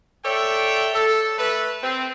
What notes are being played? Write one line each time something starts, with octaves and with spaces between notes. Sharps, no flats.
A4 C#5 D5 E5 G5
A4
A3 A4 B4
C4